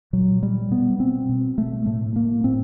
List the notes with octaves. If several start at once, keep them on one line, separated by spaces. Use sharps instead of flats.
A#2 F#3
G3
B2 B3
C4
B2
A3
A2 A3
A#3
A2 C4